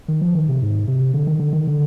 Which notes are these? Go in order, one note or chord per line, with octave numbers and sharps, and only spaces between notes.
D#3
F3
D#3
C3
G#2
C3
D3
D#3
D3
D#3
D3